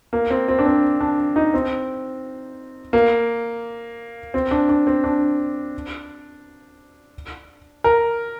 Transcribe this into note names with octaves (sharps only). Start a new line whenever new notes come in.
A#3
C4
C4
D4
C4
D4
D#4
C4
A#3
C4
D4
D4
C4
D4
A#4